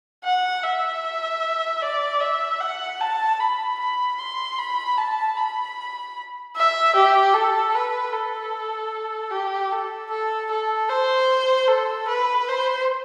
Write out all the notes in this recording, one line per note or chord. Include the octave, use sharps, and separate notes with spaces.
F#5
E5
D5
E5
F#5
A5
B5
B5
C6
B5
A5
B5
E5
G4
A4
B4
A4
G4
A4
A4
A4
C5
A4
B4
C5